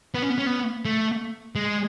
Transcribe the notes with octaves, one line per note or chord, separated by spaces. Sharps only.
B3
C#4
B3
C#4
B3
A3
G#3